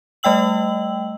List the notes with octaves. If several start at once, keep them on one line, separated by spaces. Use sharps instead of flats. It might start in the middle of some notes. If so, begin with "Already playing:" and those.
G3 A3 D#5 G5 E6 F#7